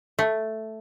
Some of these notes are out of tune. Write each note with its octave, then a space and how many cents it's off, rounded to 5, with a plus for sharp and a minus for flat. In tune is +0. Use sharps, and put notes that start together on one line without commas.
A3 +0